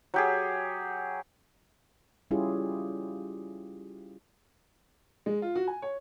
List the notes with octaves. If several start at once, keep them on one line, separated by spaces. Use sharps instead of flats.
F#3 G4 G#4
G3 C#4 E4 F4 G4 G#4
G#3
F4
F#4
G#5
C#5